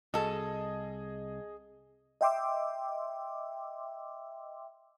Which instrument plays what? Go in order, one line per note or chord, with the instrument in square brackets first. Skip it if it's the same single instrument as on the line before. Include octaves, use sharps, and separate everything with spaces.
[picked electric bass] C2 [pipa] F#4 A4 [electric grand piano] G#4 D#5
[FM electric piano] D#5 E5 G5 C6 D6 E6